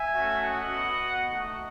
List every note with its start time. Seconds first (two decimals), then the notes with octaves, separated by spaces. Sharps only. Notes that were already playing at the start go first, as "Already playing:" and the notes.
Already playing: E5 G#5
0.15 A3 C#4 F#4
0.44 D#5 F#5
0.72 B3 F#4
1.30 A3 D#4 F#4